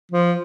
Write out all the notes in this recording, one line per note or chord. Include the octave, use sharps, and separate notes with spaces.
F3